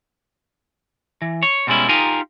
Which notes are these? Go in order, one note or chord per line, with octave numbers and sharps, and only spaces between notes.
E3
C#5
B2 G3 G#3 C#4 E4
D#4 F4 G4 A#4 F5 G#5